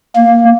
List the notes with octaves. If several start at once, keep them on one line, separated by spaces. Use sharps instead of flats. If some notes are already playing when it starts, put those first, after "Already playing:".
A#3